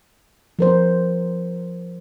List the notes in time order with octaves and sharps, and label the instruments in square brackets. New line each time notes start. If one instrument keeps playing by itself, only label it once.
[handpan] F3 A#4 C5